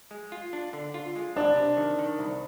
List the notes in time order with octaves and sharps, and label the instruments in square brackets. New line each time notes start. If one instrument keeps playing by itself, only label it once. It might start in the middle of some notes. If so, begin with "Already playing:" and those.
[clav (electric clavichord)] G#3
F4
D4
D3
F4
G#3
[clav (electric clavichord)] C2 [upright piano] D4
[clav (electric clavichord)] C3
D#3
D#3
C2